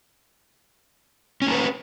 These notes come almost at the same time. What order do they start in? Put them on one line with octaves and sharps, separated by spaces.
C#4 A#3 B4